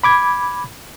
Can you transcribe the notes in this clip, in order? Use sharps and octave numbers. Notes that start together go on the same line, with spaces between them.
B5 D6 G#6